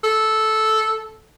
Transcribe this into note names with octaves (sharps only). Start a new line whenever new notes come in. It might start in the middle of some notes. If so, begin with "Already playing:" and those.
A4